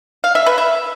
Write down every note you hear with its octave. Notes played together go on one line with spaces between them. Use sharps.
F5
E5
B4
E5